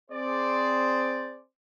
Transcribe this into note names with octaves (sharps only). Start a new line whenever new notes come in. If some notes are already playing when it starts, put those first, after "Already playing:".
C4 G#4 C5 D5